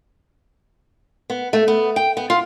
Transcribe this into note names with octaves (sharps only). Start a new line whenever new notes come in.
B3
A3
B3
G5
B3
F4